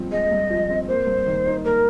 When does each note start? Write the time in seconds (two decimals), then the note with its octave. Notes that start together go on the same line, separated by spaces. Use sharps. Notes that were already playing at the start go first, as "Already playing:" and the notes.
Already playing: G2 F3 G#3 C4
0.11 G#3 D#5
0.31 G2
0.50 F3
0.70 C4
0.88 A#3 C5
1.07 G2
1.26 D#3
1.46 D#4
1.65 A#3 A#4